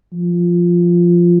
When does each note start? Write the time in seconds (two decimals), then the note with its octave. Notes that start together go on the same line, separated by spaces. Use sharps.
0.13 F3